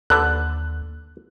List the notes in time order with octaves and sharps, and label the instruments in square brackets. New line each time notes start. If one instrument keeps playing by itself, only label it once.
[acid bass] D#2 [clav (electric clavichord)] D3 A4 B4 [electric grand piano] F#6